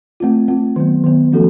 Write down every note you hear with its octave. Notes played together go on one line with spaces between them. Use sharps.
A3 C4 F4
A3 C4 F4
D#3 F#3 B3
D#3 F#3 B3
F3 A3 C#4 F#4 A4